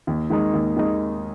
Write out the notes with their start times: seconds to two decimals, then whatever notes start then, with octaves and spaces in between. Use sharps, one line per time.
0.07 D#2
0.30 D#3 G#3 D#4
0.54 D#2
0.76 D#3 G#3 D#4